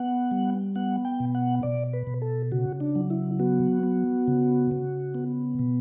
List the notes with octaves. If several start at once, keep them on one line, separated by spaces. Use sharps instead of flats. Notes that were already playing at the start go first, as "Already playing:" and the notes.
Already playing: B3 F#5
G3
B3 F#5
G5
B2
F#5
B2 D5
B4
B2
A4
C#3 F#4
D4
F#3
E4
B3 F#4
B3
C#3
C#3
B3
B2